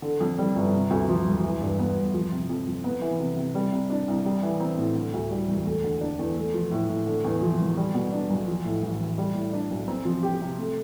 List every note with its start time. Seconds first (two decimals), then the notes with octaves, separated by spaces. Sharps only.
0.02 D3
0.20 F2
0.38 G3
0.56 G1
0.73 C3
0.91 D2
1.09 F3
1.26 E1
1.43 E3
1.61 G2
1.79 B3
1.96 G1
2.14 F3
2.32 C3
2.49 F2
2.67 F2
2.84 B3
3.01 E3
3.19 C3
3.37 C3
3.55 G3
3.72 C3
3.90 D4
4.08 C2
4.25 G3
4.43 E3
4.60 C4
4.78 A2
4.95 D3
5.14 D2
5.31 G3
5.48 E1
5.66 A3
5.84 D3
6.01 D4
6.19 E2
6.36 A3
6.54 F3
6.71 A2
6.89 A2
7.06 D3
7.24 E2
7.42 F3
7.59 E1
7.77 G3
7.94 B2
8.12 D4
8.30 B1
8.47 F3
8.65 A2
8.82 A1
9.00 A1
9.18 G3
9.35 A2
9.53 D4
9.70 B1
9.88 C4
10.05 F3
10.23 G4
10.41 C3
10.58 A3